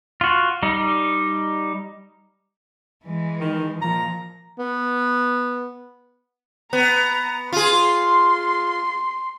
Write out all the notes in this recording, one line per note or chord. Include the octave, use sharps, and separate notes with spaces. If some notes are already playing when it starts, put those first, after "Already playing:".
F4 F#4
G3 D#4
E3 G#3
D#3
A#2 F3 A#5
B3
B3 A#5
F4 G#4 C6